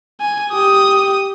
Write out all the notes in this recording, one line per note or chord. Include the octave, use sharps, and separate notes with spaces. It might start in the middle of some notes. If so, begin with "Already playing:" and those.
G#5
G4 D#6